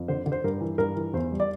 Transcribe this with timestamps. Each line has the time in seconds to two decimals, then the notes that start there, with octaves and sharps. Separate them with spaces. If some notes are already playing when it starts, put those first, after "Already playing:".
Already playing: F2
0.08 D3 C5
0.26 D3
0.32 C5
0.44 G2 A#4
0.61 E3
0.78 G2 A#4
0.96 E3
1.13 E2 C5
1.32 G3
1.40 D5